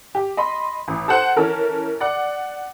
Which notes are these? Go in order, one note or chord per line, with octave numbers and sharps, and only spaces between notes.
G4
D#5 B5 C6
A1
A4 C5 F#5
E3 C#4 A4 A#4
D5 F#5